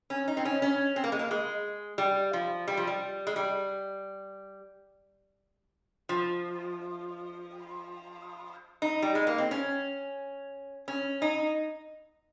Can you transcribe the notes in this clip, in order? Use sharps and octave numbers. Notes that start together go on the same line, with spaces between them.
C#4
D#4
C4
C#4
C#4
C4
A#3
G#3
A#3
G#3
G3
F3
G3
F3
G3
G#3
G3
F3
D#4
G3
G#3
A#3
C4
C#4
C#4
D#4